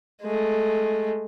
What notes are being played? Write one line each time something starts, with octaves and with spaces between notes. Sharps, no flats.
G#3 A3